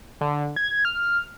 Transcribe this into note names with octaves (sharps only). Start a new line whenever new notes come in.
D3
G#6
F6